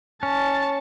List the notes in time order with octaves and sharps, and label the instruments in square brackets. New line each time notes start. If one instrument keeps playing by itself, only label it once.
[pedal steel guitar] C#4 [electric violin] A5